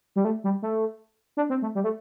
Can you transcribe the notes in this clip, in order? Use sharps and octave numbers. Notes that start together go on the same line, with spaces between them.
G3
A3
G3
A3
D4
C4
A3
G3
A3